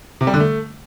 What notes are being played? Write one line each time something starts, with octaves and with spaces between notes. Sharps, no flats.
C3
G3
D3
A3